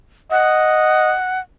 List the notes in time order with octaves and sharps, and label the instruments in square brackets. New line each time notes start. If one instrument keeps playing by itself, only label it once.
[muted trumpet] D#5 [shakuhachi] F#5